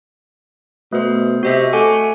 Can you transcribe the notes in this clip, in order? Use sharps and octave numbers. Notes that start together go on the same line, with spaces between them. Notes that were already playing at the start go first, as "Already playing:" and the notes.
B2 A3 C5
C3 F#4 D#5 E5
A3 F#5 G#5 D6